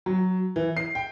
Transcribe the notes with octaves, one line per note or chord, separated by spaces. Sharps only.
F#3
E3
C7
G5